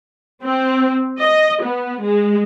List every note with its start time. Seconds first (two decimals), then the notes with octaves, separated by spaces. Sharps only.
0.43 C4
1.19 D#5
1.63 B3
2.03 G#3